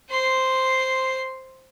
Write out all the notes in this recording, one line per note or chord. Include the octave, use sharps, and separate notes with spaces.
C5 C6